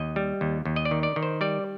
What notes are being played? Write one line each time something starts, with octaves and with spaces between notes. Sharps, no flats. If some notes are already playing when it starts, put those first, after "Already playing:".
Already playing: D#2 D#5
G3
D#2
D#2
D#5
D5
D#3
D5
D#3
C5
G3 D5